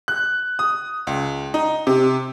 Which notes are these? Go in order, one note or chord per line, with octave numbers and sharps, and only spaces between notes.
F#6
D#6
C#2
D#4
C3